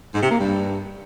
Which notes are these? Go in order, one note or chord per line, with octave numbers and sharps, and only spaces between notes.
G#2
C3
A#3
G2